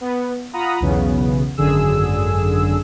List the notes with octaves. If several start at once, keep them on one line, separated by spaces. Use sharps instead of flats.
B3
F4 F#5 A#5 B5 D#6
B1 E2 C#3 B3
G#1 F#2 D3 G#4 E6